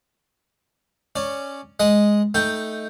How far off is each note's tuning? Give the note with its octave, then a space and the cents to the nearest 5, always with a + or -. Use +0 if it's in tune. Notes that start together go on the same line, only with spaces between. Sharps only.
C#4 +0 D5 +10
G#3 +0 D#5 +0
A3 +0 D#4 +0 G5 +0